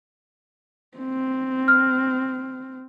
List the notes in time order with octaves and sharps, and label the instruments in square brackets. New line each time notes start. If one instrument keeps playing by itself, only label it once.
[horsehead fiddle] C4
[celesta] F6